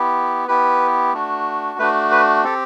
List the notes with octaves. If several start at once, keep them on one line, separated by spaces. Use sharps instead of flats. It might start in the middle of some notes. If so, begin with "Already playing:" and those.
Already playing: B3 E4 G4
B3 E4 G4 B4
A3 D4 F#4
A3 D4 F#4 B4
B4
C4 G4 A4